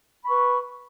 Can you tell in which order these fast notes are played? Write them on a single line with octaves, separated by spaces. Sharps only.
B5 C#6 B4